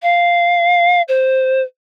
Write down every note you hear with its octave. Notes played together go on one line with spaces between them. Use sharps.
F5
C5